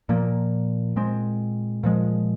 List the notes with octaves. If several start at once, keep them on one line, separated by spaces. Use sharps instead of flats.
A#2 F3 A#3
A#2 G#3 C4
A#2 F3 G#3